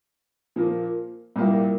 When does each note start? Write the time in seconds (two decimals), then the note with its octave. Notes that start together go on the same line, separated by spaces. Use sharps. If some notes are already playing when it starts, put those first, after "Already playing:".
0.56 A#2 F3 A#3
1.36 C2 A#2 G3 A#3